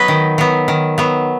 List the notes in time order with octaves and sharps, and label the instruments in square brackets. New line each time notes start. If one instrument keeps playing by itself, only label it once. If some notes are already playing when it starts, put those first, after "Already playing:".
Already playing: [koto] F#3 B3 B4 C#5 D#5
D#3
F#3 B3
D#3
F#3 B3